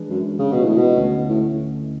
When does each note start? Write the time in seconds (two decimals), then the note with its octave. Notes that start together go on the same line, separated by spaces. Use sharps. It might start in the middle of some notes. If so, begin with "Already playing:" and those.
Already playing: E3 G#3 D4 G#4 B4
0.10 F#2
0.39 C#3
0.52 B2
0.64 A2
0.77 B2
0.96 D2 D3 A3 C#4
1.29 A2